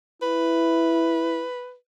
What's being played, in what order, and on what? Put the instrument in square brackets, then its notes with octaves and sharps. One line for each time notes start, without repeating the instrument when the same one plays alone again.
[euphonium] E4 [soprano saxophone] B4